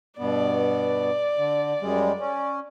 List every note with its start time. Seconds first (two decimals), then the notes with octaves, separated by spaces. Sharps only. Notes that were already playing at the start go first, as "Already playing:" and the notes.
0.19 G2 B2 B3 D5
1.37 D3
1.81 F#2 G3 G#3
2.20 C#4